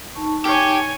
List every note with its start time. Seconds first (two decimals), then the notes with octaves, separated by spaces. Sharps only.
0.15 D#4 A5 C#6
0.46 G4 C#5 G#5